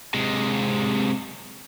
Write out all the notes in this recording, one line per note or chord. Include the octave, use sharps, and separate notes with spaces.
C3 G#3